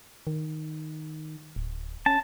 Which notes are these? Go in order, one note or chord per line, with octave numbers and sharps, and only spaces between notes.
D#3
D1
C#4 A5